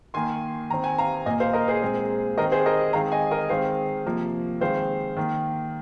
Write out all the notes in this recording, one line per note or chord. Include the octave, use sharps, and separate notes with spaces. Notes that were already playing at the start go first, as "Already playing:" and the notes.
D#3 A#3 G#5 C6
D#3 C4 A#5
G#5
F5 A#5
A#2 A#3 D#5 G#5
C5 F5
A#4 D#5
G#4 C5
A#2 G#3 C4
D#3 C4 A#4 D#5
G#4 C5
A#4 D#5
D#3 G#3 C4 F5 A#5
D#5 G#5
A#4 D#5
D#3 G#3 C4 C5 F5
C3 F3 A#3
D#3 G#3 C4 C5 F5
D#3 A#3